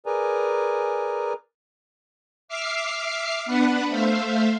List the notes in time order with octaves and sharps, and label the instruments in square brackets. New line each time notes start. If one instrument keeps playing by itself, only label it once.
[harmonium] G#4 A#4 B4 D5 G#5 A#5
[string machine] E5 D6 F6 C7
B3 D4 B4 F#5 B5
A3 C5 E5 F5